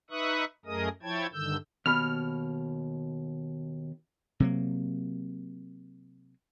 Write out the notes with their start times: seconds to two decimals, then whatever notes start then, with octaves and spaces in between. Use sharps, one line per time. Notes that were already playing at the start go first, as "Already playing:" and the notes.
0.10 D#4 B4 E5 C#6 D#6 F#6
0.65 F#2 A3 G#4 A#4 D#5 D#6
1.03 F3 E4 C#5 G5 A5 G#6
1.33 G2 D3 D#3 E6 G6
1.86 D#2 B2 B5 F6
4.40 C3 F#3 A#3